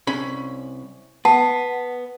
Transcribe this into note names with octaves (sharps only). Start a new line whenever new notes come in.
C2 C#4 B5
B3 F#5 A5